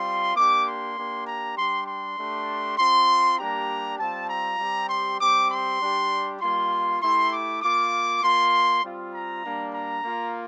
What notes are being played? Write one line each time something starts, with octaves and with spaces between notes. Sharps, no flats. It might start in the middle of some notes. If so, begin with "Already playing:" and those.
Already playing: G3 C4 F4 C6
A#3 D4 G4 D6
C6
A#3 D4 G4
A#5
G3 D4 G4 C6
C6
A3 D4 G4
C4 F4 C6
G3 A#3 D4 G4 A#5
G3 C4 F4 A5
A#5
G3 C4 G4
C6
G3 C4 G4 D6
C6
G3 D4 G4
G3 A#3 F4 C6
A3 E4 G4 C6
D6
A#3 F4 D6
A#3 F4 C6
G3 C4 F4
A#5
G3 A#3 D4
A#5
A#3 F4